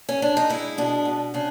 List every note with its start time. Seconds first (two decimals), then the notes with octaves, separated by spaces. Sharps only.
0.09 C#4
0.22 D4
0.37 D#4
0.50 G#3 E4
0.78 B2 D4
1.05 B2
1.34 C#3 D4